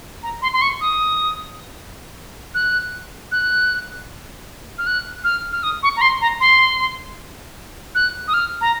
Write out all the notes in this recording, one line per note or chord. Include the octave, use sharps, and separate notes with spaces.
A#5
C6
C6
C#6
D#6
F#6
F#6
F6
F#6
F6
F6
D#6
C#6
A#5
C6
A#5
C6
F#6
D#6
F6
A#5